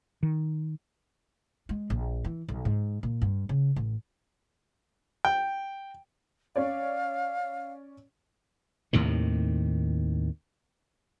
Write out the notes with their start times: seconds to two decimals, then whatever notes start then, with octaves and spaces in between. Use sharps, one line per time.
0.23 D#3
1.69 G#3
1.90 A#1
2.25 E3
2.48 B1
2.65 G#2
3.03 A#2
3.22 G2
3.49 C#3
3.76 A1
5.25 G5
6.56 C#4 C#5 D5 F5
8.93 D#2 A2 C3 D#3